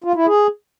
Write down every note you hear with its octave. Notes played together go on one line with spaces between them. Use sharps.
F4
E4
G#4